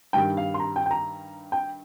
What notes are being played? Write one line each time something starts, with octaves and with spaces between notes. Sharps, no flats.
G2 D#3 G3 G5
F5
C6
A#5
G5
G5
A#5
G5